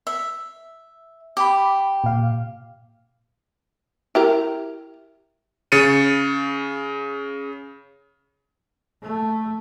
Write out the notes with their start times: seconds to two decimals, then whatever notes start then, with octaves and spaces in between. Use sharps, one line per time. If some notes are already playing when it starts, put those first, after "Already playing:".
0.07 E5
1.37 G4 B5 D6
2.04 A#2 F5
4.15 E4 G4 A#4
5.72 C#3 A6 C#7 D#7
9.03 A3